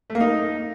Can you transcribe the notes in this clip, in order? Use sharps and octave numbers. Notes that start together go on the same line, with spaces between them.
A3
A#3
D#4